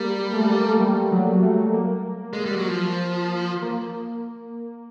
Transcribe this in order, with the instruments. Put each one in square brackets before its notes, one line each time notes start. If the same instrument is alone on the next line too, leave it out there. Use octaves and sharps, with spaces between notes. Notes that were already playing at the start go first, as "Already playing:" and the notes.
Already playing: [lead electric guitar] G3 [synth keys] A#3
[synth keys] A3
A#3
A3
A#3
A3
G3
F#3
A3
A#3
[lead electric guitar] G#3
G3
F#3
F3
[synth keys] A#3